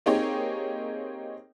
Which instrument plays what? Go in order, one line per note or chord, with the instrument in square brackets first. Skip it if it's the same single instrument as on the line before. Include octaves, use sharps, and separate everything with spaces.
[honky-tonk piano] A#3 C4 D#4 G4 G#4 C#5